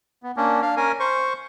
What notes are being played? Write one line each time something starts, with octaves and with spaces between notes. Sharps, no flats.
B3
A#3 C#4 D4
D4 F5
C#4 A#4 G#5
C5 C#6